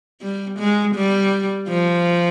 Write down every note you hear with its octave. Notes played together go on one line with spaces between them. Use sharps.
G3
G#3
G3
F3